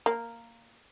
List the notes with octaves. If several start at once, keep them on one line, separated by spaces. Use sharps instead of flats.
A#3